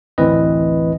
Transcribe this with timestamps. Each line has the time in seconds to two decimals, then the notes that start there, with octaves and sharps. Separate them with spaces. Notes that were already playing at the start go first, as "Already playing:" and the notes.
0.18 A1 D2 E3 C4 B4 D#5